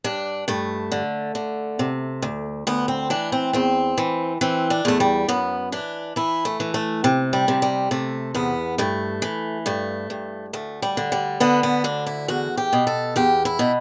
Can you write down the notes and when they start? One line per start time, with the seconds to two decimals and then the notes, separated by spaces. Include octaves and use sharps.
0.04 G2 D4
0.48 G2 A3
0.92 D3
1.35 D3
1.79 C3
2.22 D2
2.67 D2 B3
2.88 C4
3.10 E3 D4
3.32 C4
3.53 E2 C4
3.98 E3
4.41 E3 C4
4.70 D4
4.85 E2 A3
5.00 G3
5.29 F#2 B3
5.72 E3 D4
6.16 E3 E4
6.45 A3
6.60 E3
6.74 A3
7.04 C3
7.33 G3
7.48 C3
7.62 G3
7.91 C3 A3
8.35 E2 B3
8.78 G2 A3
9.22 E3
9.66 G2 A3
10.10 G2
10.53 D2 A3
10.82 G3
10.97 D3
11.12 G3
11.40 D3 B3
11.63 B3
11.84 D2 D4
12.06 E4
12.28 E2 F#4
12.57 G4
12.73 B2
12.87 A4
13.16 E2 G4
13.45 E4
13.59 B2